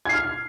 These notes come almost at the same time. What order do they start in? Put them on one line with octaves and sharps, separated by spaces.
G#6 C7 F6